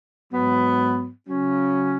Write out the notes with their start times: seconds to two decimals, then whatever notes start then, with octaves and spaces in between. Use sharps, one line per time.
0.31 G#2 F#3 B3
1.27 C#3 F#3 C#4